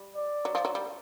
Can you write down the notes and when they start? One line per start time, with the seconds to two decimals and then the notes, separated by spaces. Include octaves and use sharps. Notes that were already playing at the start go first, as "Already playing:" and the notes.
Already playing: G3
0.16 D5
0.45 F#3
0.55 F3
0.65 F#3
0.75 G3